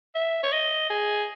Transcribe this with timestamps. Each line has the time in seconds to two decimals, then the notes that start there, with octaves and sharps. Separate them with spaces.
0.15 E5
0.43 C#5
0.52 D#5
0.90 G#4